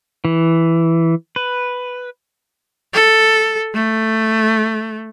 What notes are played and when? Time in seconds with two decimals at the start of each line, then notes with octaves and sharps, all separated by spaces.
0.25 E3
1.36 B4
2.94 A4
3.75 A3